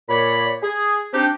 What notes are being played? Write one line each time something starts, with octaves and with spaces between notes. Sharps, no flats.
A#2 C#5 D5 B5
G#4
C4 D4 D#4 G4